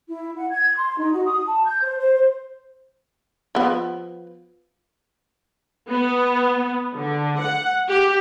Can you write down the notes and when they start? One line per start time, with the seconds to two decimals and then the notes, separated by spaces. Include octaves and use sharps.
0.09 E4
0.36 F#5
0.50 G#6
0.76 C6
0.98 D#4
1.12 F#4
1.25 D#6
1.46 A5
1.66 G6
1.82 C5
1.98 C5
2.14 C5
3.55 F3 B3
5.89 B3
6.95 D3
7.38 F#5
7.89 G4